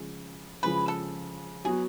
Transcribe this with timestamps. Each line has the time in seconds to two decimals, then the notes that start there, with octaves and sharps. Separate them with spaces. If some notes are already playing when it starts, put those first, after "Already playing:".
Already playing: C#3 F3 G#3
0.63 C#3 F3 G#3 B4
0.88 A4
1.65 F#3 B3 F#4 G#4